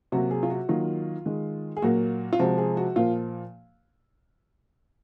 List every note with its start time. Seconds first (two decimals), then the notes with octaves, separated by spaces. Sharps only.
0.12 C3 F#3 A#3 F#4
0.31 G#4
0.43 F4
0.50 F#4
0.69 D#3 F#3 A#3 F4
1.26 D#3 G#3
1.77 G#4
1.82 A#2 F#3 A#3 F#4
2.33 F4
2.39 C3 F3 G#3 F#4
2.58 G#4
2.77 F#4
2.96 A#2 F3 A#3 F4